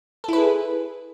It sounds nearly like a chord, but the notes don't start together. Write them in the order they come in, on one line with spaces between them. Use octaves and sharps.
A4 E4 B4 G#4